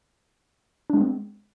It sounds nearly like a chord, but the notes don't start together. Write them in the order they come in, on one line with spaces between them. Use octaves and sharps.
D4 G#3 B3 C4